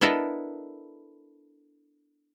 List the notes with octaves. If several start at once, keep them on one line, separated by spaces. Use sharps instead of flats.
B3 D4 E4 A4 A#4 D#5